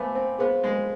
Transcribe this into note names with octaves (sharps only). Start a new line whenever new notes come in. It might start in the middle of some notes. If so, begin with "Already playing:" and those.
Already playing: A3 B3 C5 F5 G#5 B5 D6
C4
B3 G#4 C5 F5
G#3